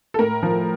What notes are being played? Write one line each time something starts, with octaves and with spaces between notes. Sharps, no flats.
A4
A2 A#4
F3